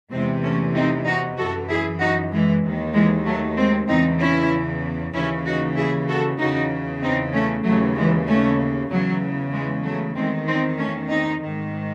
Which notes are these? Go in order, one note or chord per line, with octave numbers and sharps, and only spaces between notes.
E2 C3 E3 G#3 C4
A3 C#4
C4 D#4
D#4 F#4
F#2 E3 F#4 A4
E4 G#4
D#4 F#4
E3 G#3
D#2 D#3
E3 G#3
F#3 A3
G#3 C4
E2 C#3 E3 C4 D#4
C#4 E4
D#2 C#3 E3 C#4 E4
D#4 F#4
E4 G#4
F#4 A4
E2 C#3 E3 D#4 F#4
C4 D#4
A3 C#4
D#2 C#3 E3 F#3 A3
E3 G#3
A3 C#4
E2 C#3 E3 F#3
E3 G#3
F#3 A3
E2 D#3 G#3 C4
C4 D#4
A3 C#4
C4 D#4
G#2 D#3